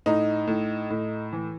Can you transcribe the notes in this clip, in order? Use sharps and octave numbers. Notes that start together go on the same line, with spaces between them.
A2 D#4
A2
A2
E3